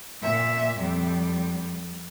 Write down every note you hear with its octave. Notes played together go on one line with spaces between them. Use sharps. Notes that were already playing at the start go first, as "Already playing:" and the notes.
A#2 E5
F2 G3